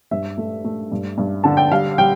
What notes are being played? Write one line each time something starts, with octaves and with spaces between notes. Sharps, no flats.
G2 E5
A3
A3
G2
G2
D3 A5
G5
G3 F5
G3 G5